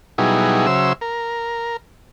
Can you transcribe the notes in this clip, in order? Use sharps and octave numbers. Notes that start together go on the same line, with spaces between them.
B2 F#3 G3 D#4 E4 G#4
C#3 F#3 C5 E5 E6
A#4